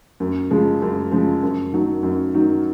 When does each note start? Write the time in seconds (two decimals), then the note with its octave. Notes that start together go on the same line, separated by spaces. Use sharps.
0.20 F#2
0.51 C#3 F3 G#3
0.82 F#2
1.11 C#3 F3 G#3
1.43 F#2
1.73 D#3 F#3
2.03 F#2
2.34 D#3 F#3